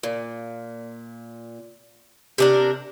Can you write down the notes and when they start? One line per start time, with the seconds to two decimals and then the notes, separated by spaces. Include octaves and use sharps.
0.03 A#2
2.38 C3 D4 A#4